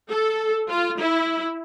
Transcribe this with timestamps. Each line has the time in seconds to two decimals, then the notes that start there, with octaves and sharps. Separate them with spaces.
0.10 A4
0.69 F4
0.99 E4